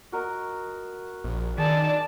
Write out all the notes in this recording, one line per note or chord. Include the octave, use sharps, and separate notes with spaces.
F#4 A#4 D#5
A#1
D#3 G#4 D5 A5